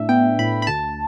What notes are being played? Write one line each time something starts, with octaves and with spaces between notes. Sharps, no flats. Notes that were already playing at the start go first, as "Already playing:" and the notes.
Already playing: A2 D4 E5
B3 G5
A2 B5
B5
D2 A5